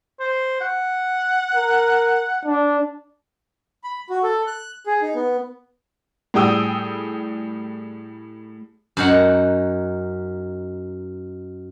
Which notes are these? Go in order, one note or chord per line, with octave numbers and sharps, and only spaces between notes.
C5
F#5
A#4
D4
B5
F#4
A4
F#6
G#4
D#4
B3
A2 G3 G#4 G5 D#6 E6
F#2 D#4 F#5